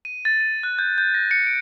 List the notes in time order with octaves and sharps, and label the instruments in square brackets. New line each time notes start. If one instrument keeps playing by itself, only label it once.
[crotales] D#7
A6
D#7
F#6
G6
G6
A#6
C#7
D7